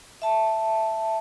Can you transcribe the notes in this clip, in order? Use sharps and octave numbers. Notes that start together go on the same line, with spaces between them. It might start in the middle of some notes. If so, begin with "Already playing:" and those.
E5 A5